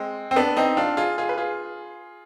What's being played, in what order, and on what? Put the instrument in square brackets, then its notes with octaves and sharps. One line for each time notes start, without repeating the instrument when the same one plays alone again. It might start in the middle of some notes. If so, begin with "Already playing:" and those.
Already playing: [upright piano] G#3 C4
C4
B3 D4
C4 D#4
D4 F4
F4 G#4
F4 G#4
B4
F4 G#4